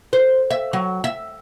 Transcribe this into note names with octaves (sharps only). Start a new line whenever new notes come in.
C5
E5
F#3
E5